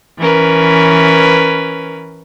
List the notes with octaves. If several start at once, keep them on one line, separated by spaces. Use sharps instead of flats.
E3 C#4 A#4 B4